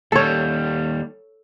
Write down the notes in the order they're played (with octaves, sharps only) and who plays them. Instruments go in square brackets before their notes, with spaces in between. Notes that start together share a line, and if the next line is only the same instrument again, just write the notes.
[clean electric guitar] D#2 G3 [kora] A4 C#5